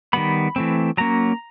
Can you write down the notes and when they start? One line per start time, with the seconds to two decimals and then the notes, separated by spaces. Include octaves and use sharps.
0.13 D#3 G3 B3 B5
0.56 E3 A3 C4
0.97 F#3 A#3 C#4 A#5